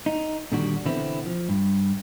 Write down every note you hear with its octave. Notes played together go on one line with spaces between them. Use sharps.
D#4
A#2 D3 D#3 G3 D4 F#4
B2 D3 E3 B3 C4 E4
F3
G2